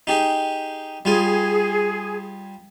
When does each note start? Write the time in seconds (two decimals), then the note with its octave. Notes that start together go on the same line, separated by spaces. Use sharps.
0.07 D#4 G4 G#4
1.05 G3 F4 G#4 G#5